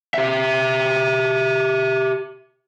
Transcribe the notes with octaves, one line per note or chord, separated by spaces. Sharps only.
G4 E5